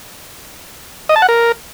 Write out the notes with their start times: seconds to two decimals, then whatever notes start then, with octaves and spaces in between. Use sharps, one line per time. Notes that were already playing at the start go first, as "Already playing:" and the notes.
1.09 D#5
1.16 A5
1.22 F#5
1.29 A#4